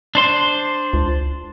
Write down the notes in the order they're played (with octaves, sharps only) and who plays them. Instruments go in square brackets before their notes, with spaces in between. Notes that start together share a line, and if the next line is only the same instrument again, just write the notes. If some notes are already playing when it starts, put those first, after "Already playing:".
[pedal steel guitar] D4 C5 C6
[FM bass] C#2